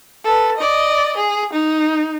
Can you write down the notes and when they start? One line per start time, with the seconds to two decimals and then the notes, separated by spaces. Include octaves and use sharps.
0.24 A4 B4
0.57 D5 D#5
1.17 G#4
1.53 D#4